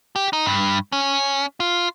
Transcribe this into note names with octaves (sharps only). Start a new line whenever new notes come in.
G4
D#4
G2
C#4
F4